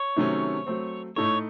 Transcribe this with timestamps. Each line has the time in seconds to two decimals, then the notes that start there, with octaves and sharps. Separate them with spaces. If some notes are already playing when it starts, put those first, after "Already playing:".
Already playing: C#5
0.16 C3 D#3 F#3 A3 C#4
0.67 F#3 A3 C4
1.16 A2 A3 D#4 A4 C#5